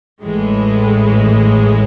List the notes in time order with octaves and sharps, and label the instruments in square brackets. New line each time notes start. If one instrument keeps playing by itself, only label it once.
[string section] A1 A2 E3 G#3